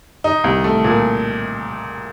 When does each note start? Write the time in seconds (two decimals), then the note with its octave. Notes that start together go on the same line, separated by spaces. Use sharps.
0.24 D#4
0.44 C2
0.64 A3
0.84 A#2